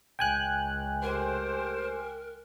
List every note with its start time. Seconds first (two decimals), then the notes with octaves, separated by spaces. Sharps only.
0.19 C#2 G5 G#5 F#6
1.03 A3 G4 A#4 C5